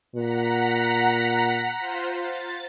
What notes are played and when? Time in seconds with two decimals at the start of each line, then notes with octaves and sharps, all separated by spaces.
0.15 A#2 F#5 A#5 B6
1.78 F4 C5
2.14 A6